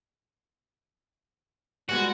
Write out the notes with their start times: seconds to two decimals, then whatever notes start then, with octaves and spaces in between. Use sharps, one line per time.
1.89 G3 G#3 B3 F#4